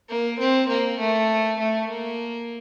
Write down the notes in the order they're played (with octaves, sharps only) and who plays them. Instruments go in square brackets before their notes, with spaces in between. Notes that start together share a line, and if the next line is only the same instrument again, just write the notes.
[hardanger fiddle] A#3
C4
A#3
A3
A3
A#3